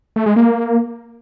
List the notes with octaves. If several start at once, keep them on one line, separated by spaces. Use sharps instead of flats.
A3
G#3
A#3